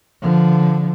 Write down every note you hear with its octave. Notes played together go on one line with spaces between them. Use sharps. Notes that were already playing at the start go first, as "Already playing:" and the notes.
D3 F3